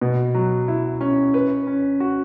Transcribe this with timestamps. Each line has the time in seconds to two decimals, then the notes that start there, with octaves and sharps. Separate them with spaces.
0.01 B2
0.34 F#3
0.68 E4
1.01 C#4
1.34 B4
1.67 C#4
2.00 F#4